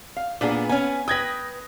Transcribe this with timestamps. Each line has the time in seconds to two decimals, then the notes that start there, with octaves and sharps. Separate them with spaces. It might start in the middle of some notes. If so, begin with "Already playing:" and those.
0.17 F5
0.41 A#2 B3 D4 G#4 D5
0.69 B3 C#4 G#5
1.08 B4 G5 D#6 G#6 A#6